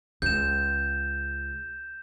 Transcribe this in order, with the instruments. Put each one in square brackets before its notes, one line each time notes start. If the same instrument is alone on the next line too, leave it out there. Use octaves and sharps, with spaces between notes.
[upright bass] C#2 [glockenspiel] G6 E7